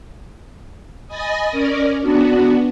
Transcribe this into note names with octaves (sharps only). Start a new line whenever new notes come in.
D#5 G#5 B5 D#6 A6 A#6
C#4 A#4 D5
B3 D4 F#4